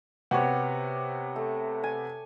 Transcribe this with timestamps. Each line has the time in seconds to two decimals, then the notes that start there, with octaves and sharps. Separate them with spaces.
0.31 C3 B3 F#4 G4 C#5
1.36 A3
1.84 G#5